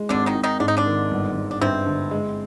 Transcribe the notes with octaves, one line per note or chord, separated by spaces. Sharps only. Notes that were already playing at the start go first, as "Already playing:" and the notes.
Already playing: G#3
G#1 D3 D4
D#3 D#4
G#1
D#3 D#4
G#2 D4
D#4
D3 D4
D#3
G1
G1
D4
G2 C3 C4
D3
G#3